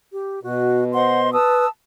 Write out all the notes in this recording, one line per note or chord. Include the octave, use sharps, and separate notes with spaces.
G4
B2 F#4
C5 D#5 F#5 C6
B4 A5 D#6 E6